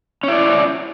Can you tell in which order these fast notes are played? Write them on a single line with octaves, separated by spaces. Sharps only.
C#4 E4 D5